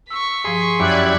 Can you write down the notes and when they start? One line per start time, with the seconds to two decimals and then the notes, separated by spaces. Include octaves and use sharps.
0.10 C#6 E6 B6
0.45 G2 F3 G#4 C6
0.80 F#2 E4 G4 D5 F#6 G#6